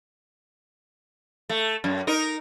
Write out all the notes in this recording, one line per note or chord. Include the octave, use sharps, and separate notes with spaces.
A3
F#2
D#4 A#4